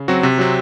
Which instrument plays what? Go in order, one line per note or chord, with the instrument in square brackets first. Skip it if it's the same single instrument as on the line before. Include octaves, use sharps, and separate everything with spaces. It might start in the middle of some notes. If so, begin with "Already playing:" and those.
Already playing: [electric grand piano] C#3
F#3 C4 F#4
C3
F#3 C4